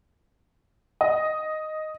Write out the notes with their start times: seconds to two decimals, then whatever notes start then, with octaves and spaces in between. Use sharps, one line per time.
1.01 D#5